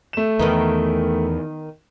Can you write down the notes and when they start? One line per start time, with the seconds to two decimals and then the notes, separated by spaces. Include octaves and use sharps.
0.13 A3 E7
0.39 E2 D#3 B3 D#4